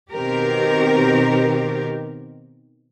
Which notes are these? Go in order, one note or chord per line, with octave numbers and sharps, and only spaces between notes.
B2 D#3 C4 G4 A#4